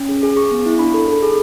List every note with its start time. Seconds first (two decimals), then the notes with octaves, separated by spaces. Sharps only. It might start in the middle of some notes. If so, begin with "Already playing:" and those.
Already playing: C#4
0.09 G#4
0.23 G#4
0.36 G#4 C#6
0.51 B3
0.66 E4
0.79 D4 B5
0.94 A4
1.08 A4
1.23 G#4